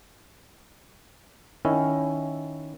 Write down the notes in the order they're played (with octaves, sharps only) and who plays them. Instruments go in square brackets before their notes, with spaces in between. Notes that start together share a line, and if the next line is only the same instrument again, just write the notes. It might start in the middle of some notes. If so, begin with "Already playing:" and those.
[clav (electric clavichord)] D#3 C#4 E4